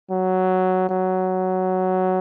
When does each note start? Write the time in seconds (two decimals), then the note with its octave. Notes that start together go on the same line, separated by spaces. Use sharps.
0.11 F#3
0.89 F#3